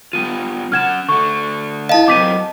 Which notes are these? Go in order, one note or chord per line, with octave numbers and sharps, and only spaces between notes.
G3 B3 F4 D#7
C#4 F#5 F6 G#6 E7
D3 A3 C#6
E4 D#5 F5 A5
F#2 F#3 C4 D6 B6 D#7